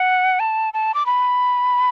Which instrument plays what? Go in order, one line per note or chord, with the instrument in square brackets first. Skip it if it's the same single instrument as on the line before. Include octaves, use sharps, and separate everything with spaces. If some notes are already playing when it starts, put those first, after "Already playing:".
Already playing: [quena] F#5
A5
A5
D6
B5